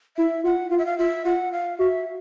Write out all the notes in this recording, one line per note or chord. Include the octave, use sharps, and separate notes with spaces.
E4 E5
F4 F#5
F4 F5
E5
F5
F4 E5
F4 F#5
F5
F#4 E5